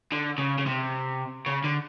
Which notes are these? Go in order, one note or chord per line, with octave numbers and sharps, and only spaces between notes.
D3
C#3
C#3
C3
C#3
D3